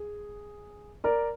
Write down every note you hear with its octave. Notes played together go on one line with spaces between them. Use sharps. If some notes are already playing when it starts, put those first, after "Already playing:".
Already playing: G#4
A#4 D5